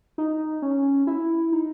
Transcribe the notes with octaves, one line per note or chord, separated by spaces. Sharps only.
D#4
C#4
E4
D#4